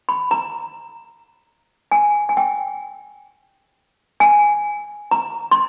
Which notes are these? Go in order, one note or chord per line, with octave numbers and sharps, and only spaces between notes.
B5
A#5
G#5
G#5
G5
G#5
A#5
C6